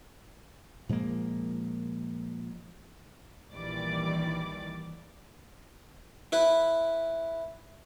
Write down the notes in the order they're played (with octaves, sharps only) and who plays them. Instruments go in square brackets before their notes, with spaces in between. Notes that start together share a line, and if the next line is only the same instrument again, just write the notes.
[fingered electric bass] A#2 F3 G#3 A#3
[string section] A#1 D#3 E3 G3 D5 D6
[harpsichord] E4 B4